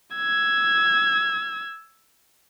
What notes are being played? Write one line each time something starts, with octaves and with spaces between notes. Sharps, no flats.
E6 G#6